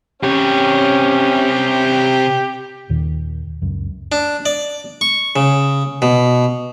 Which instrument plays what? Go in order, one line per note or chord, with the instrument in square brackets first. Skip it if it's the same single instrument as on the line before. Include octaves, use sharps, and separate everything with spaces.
[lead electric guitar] C3 C#5 [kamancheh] C#4 [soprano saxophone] G4
[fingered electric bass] D#2 A#2 D#3
C#2 F#2
[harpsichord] D4
D5
C#6
C#3
B2